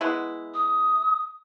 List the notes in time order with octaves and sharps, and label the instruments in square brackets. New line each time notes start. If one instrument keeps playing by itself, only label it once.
[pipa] G#3 B3 E4
[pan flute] D#6